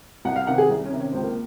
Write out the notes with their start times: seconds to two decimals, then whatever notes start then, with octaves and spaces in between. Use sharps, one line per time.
0.25 C2 F#5
0.36 F5
0.47 C3 D#3 F#5
0.58 G#4
0.70 C2
0.85 C#4
0.92 C3 D#3
1.00 C#4
1.12 C#2 C4
1.23 A#3